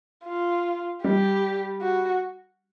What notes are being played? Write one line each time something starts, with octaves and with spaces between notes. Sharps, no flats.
F4
G3 G4
F#4